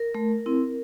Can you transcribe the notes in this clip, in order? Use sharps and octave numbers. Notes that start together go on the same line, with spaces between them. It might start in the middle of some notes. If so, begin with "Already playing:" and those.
Already playing: A#4
A3
C4 E4